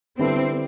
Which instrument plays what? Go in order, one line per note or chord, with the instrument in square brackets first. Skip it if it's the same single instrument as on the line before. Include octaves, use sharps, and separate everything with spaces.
[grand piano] D3 G3 B3 E4 A4 [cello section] C4